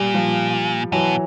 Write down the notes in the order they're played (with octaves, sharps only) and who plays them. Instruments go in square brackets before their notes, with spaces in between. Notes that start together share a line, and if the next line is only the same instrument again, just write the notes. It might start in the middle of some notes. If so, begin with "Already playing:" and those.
Already playing: [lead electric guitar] A#2 [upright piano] G3
[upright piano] F3 G3
[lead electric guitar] B2 [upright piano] E3 F#3